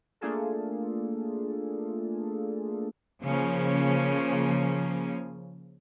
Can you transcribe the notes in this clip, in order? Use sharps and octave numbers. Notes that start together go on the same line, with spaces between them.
A3 A#3 D4 F4 G#4 A4
C#3 F3 A#3 C#4